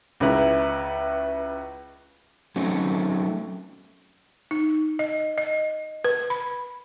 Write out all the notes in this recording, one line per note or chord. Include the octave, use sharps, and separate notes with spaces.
C#2 C#3 E4 B4 A#5
F#3 A3 C4 C#4 D#4
D#4
D#5
D#5
B4
B5